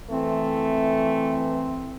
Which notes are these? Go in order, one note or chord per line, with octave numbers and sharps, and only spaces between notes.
E3 A3 C4